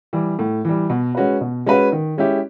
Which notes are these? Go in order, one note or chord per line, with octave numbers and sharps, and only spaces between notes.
E3 G3
A2
E3 G3
B2
G#3 C#4 F#4 B4
B2
G#3 C#4 F#4 B4
D#3
G#3 C#4 E4 G4